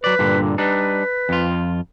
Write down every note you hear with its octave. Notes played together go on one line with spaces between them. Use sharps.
F#3 B4 D5
G2 A#2 D3
G3 D4 D#4 B4
F2 F4